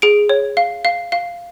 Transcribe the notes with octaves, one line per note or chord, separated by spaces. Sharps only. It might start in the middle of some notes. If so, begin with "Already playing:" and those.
G#4 D7
C#5
F5
F5
F5